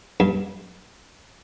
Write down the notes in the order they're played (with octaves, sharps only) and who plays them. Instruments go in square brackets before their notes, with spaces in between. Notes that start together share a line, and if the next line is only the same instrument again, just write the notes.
[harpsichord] G2